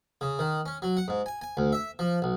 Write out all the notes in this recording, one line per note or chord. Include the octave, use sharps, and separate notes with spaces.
C#3
D#3
C#4
F#3
F#5
G#2
G#5
G#5
D2
E5
F3
B1